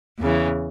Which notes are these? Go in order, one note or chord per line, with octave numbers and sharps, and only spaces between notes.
E2 C#3 E3